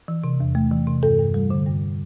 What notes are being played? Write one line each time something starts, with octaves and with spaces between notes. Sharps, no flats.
E3
C3
E2
A3
E3
C3
G2 A4
G2
G3
D3
G2